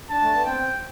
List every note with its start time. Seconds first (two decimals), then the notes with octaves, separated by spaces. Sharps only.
0.09 D4 A5
0.21 A3
0.33 B3
0.44 C4 G5